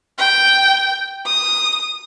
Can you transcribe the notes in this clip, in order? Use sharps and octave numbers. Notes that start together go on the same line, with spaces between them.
G5
D#6